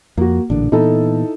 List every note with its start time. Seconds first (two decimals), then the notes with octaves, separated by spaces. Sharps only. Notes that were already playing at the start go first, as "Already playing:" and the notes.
0.18 F2 A#3 F#4
0.50 A1 A#2 D3 D4
0.72 A#2 E3 B3 D#4 E4 A4